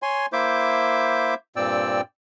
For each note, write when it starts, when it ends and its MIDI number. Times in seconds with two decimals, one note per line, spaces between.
0.02 0.26 73
0.02 0.26 80
0.02 0.26 84
0.33 1.34 58
0.33 1.34 64
0.33 1.34 72
0.33 1.34 76
0.33 1.34 86
0.33 1.34 91
1.56 2.01 43
1.56 2.01 46
1.56 2.01 60
1.56 2.01 74
1.56 2.01 79
1.56 2.01 88